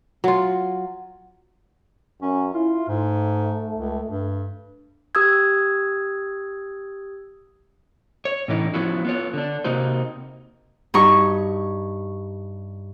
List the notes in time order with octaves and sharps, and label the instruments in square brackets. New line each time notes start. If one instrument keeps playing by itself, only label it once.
[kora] F#3 F4
[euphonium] F#2 [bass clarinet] C#4
[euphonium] E4 [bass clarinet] F4
[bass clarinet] G#2 [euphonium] A3
[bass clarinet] C#2
G2
[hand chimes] G4 D#6 E6 G#6
[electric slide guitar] C#5
A2 D3 E3 C#4 D#4 E4
F3 B3 C#4 E4 F#4
B3 F4 C#5
D3 D4
C3 A#3 D#4 F#4 C5
[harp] G2 D#4 C#6